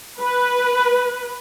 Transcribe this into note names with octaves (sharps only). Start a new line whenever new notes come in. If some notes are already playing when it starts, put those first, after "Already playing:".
B4